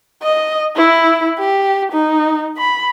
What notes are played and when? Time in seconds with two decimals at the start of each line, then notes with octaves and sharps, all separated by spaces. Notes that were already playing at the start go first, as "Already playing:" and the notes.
0.23 D#5
0.76 E4
1.39 G4
1.92 D#4
2.58 B5